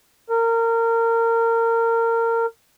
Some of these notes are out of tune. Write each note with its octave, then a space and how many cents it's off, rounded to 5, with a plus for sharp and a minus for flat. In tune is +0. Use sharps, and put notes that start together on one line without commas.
A#4 -25